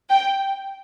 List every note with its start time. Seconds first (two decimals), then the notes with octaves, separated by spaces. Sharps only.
0.10 G5